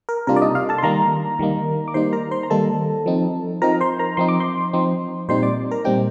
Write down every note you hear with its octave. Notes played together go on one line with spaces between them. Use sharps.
A#4
C3 G3 A#3 D4 F4 A#4
D5
D#4 D#5
F4 F5
A4 A5
C6
D#3 G3 A#3 D#4 A#4 A#5
D#3 G3 A#3 D#4
D6
D#3 G3 A#3 D#4 C5 C6
A#4 A#5
C5 C6
A#5
D#3 G3 A#3 D#4 A4 A5
F3 C4 D#4
F3 C4 D#4 A#4 A#5
C5 C6
A#4 A#5
F3 C4 D#4 C6
D6
C5 C6
F3 C4 D#4
A#2 G3 C4 D#4 C5 C6
D5 D6
A#4 A#5
A#2 G3 C4 D#4 G4 G5